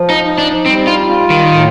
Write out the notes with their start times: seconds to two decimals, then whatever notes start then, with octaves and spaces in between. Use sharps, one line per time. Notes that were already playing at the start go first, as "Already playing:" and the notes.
Already playing: F3
0.10 D#4
0.24 D#4
0.38 D4
0.66 G3 C4
0.87 F4
1.09 F4
1.30 D#3
1.51 A2